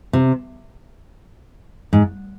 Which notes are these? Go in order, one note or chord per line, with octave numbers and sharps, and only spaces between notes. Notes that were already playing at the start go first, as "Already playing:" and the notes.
C3
G#2